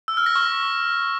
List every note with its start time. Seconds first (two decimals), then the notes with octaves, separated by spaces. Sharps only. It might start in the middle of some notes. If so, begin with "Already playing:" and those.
0.08 E6
0.17 F6
0.26 A#6
0.35 C#6